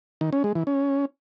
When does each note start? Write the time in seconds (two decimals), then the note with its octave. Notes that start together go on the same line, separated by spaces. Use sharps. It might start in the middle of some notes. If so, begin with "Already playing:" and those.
0.21 D#3
0.33 C#4
0.44 G#3
0.55 E3
0.67 C#4